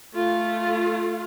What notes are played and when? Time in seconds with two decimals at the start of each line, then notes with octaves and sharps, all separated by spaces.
0.15 A3 F4